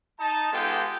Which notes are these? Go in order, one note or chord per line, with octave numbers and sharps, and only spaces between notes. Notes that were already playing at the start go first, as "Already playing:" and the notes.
D#4 A5
G#3 B3 F4 G4 A4 G5